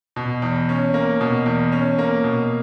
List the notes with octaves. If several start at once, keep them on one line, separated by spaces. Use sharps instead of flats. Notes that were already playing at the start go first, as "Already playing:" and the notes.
B2
E2
C#4
A#3
B2
E2
C#4
A#3
B2